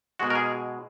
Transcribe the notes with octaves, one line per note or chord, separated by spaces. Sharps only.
B2 G#3 F#4
A#4
G#4